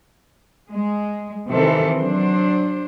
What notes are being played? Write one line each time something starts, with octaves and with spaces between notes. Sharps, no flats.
G#3
C3 D#3 E3 C4 A4
F#3 D4 C5